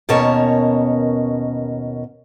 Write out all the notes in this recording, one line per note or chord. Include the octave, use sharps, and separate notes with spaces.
D#2 B2 C#4 A#4 C#5 A5